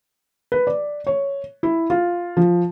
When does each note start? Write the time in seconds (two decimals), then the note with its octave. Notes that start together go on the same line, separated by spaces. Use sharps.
0.52 B4
0.67 D5
1.07 C#5
1.63 E4
1.90 F4
2.37 F3